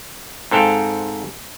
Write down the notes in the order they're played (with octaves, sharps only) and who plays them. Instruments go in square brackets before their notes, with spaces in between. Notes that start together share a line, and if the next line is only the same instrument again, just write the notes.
[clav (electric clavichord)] G#2 C4 A4 F5 G5